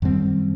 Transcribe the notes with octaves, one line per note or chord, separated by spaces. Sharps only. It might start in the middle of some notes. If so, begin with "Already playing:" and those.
F#2 D#3 G3 C4